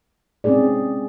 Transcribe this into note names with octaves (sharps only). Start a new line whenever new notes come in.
G#3 C4 C#4 D#4 G#4 D5